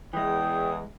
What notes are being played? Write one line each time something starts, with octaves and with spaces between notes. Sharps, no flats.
E2 E3 G#3 G5 D#6